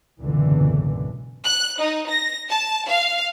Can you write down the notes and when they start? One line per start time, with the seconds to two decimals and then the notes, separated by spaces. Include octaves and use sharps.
0.22 F#1 C#2 G#2 B2 D3 E3
1.46 F#6
1.80 D#4
2.10 A#6
2.50 A5
2.89 F5